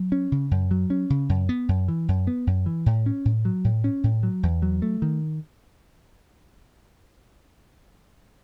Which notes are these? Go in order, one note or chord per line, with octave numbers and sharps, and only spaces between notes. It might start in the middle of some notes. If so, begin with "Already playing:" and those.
Already playing: F#3
C#4
C#3
F#2
F#3
C#4
C#3
F#2
B3
F#2
E3
F#2
B3
F#2
E3
A2
C#4
A2
F#3
A2
C#4
A2
F#3
E2
F#3
A3
D#3